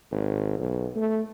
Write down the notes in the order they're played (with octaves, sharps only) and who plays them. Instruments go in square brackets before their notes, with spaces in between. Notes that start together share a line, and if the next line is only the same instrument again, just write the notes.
[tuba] G#1
B1
A3